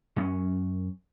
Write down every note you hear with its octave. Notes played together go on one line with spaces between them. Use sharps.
F#2 B3 C#4